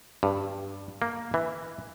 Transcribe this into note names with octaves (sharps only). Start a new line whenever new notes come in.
G2
A#3
E3